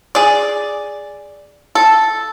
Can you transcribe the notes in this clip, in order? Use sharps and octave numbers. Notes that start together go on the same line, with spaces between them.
G#4 D5
A4